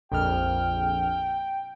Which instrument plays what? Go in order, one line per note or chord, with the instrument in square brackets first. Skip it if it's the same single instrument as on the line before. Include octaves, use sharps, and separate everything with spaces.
[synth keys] A#1 F2 F6 [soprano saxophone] G5